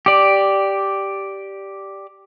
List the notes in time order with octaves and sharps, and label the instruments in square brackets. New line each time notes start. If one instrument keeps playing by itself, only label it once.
[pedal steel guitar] G4 D5